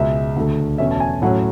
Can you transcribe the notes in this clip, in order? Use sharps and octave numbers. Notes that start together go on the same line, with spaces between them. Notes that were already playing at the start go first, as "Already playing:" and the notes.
Already playing: C#2 B2 G#3 E5
D2 D3 A3
E2 B2 A3 C#4 E5
A5
G#5
A2 F#3 A3 C#4 F#5